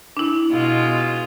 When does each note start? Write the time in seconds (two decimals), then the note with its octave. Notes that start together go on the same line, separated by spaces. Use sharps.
0.17 D4 E4
0.51 B2 G#3 F4